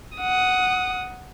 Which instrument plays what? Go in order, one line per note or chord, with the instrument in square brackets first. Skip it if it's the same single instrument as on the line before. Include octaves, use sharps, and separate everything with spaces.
[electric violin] F#5 D#6